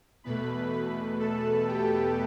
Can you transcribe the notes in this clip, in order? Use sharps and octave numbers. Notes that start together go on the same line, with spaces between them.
E2 B2 A3 B4 B5
B4 B5
A4 A5
G4 G5